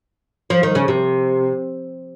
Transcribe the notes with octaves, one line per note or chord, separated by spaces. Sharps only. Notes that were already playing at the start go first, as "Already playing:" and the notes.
F3
D#3
C#3
C3